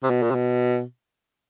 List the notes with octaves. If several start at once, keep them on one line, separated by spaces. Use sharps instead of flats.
C3
B2
A#2
C3
B2